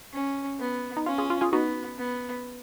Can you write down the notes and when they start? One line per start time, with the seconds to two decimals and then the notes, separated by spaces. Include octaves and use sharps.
0.14 C#4
0.60 B3
0.97 D#4
1.06 C#4 F4
1.18 F4 G#4
1.30 F4
1.41 F4 G#4
1.52 B3 D#4 F#4
1.99 B3